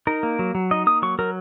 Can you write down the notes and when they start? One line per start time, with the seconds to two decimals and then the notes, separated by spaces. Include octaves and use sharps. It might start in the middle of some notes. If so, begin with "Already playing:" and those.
0.07 D#4 A#4
0.23 A#3
0.39 F#3
0.55 F#3
0.71 D#4 D#5
0.87 A#3 D#6
1.02 F#3 C#6
1.19 F#3 A#4